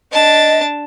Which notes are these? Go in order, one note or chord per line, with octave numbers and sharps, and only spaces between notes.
D4 D#5 A5